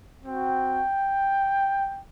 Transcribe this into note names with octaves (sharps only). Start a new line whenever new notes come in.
C4 F#4 G5